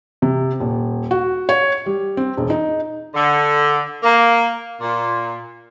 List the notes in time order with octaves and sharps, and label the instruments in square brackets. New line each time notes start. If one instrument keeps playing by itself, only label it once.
[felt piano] C3
D#1
F#4
C#5
G3
C4
E1
D#4
[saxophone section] D3
A#3
A#2